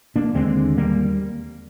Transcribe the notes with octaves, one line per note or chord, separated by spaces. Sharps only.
A#3 D4
D#2 D3 G#3 C4
G3 A#3